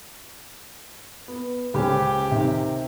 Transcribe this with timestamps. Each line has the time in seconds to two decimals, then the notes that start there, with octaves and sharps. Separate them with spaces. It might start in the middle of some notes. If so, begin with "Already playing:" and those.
1.28 B3
1.74 C#2 C#4 G4 C5
2.31 C3 D#3